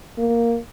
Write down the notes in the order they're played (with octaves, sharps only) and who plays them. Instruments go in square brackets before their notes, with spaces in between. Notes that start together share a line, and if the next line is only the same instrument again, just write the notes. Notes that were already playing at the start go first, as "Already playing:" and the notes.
[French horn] A#3